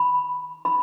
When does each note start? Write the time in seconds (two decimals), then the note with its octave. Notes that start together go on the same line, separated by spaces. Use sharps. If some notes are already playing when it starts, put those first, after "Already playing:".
Already playing: B5
0.65 B5